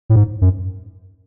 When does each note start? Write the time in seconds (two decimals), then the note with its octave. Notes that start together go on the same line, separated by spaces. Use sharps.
0.10 A2
0.16 G#2
0.41 F#2